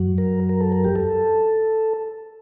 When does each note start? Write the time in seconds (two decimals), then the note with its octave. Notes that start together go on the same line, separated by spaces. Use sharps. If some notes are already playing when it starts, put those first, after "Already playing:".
Already playing: F#2 F#3
0.18 A#4
0.49 A#4
0.60 A4
0.72 A#4
0.84 G4
0.96 A4